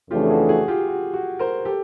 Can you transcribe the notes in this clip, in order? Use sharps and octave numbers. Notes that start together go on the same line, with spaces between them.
F2 C#3 E3 A3 D4 F4 G4
F#4 G#4
F#4 G#4
F4 G4
F#4
F#4
A#4 C5
G4 A4